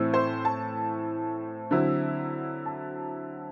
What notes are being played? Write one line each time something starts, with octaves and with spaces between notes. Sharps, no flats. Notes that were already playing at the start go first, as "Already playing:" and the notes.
Already playing: A2 E3 A3 C4 E4
C5
A5
D3 F#3 C4 E4
A5